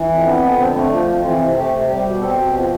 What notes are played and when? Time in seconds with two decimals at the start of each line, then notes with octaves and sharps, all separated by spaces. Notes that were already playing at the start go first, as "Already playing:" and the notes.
Already playing: E3
0.09 F2
0.25 B3 D4
0.42 F2
0.58 D3 C4
0.74 A3
0.91 F3 D4
1.07 F2
1.23 E3 F4
1.39 C3
1.56 A3 G4
1.72 C3
1.88 G3 G4
2.05 B2
2.21 C4 A4
2.38 B2
2.54 F3 G4